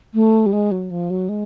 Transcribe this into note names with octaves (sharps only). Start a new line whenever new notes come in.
A3
G3
G#3
F#3
F3
F#3
G#3